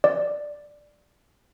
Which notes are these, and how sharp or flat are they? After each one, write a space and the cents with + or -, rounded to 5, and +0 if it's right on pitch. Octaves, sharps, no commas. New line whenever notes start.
D5 +5